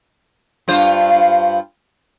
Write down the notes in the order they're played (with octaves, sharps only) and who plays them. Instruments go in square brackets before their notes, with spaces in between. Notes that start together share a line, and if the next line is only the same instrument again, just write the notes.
[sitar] G2 F4 C5